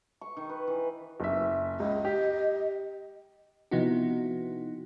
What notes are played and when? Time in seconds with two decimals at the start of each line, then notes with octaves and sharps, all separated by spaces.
0.21 C#6
0.37 D#3
0.49 B4
0.67 E3
1.20 F#1 E5
1.80 C#2 D#5
2.05 G4
3.71 C3 F3 B3 D#4 E4 F#4